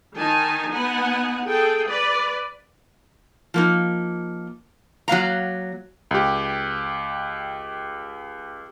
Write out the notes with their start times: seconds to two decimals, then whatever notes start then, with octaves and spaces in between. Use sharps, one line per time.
0.16 D#3 D#4 G#5 A5
0.72 B3 D#4 F#5 G#5
1.45 G#4 A4 G5
1.88 B4 D5
3.54 F3 A#3 D#4
5.08 F#3 A#3 F5 A#5
6.11 C#2 G4